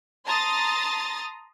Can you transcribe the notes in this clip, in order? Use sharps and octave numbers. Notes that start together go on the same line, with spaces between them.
A5 A#5 C6 D#6 A6